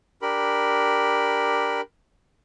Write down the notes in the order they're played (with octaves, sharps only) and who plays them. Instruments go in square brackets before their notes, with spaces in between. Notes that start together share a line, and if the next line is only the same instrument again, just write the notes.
[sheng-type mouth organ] D4 G4 A#4 B5